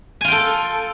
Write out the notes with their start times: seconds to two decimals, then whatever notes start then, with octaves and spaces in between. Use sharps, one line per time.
0.21 G#5
0.24 F4
0.28 G5
0.32 A4